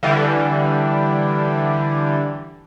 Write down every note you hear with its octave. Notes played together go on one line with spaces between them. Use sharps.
D3 E3 G3